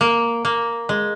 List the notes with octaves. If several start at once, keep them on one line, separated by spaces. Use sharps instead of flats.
A#3
A#3
G#3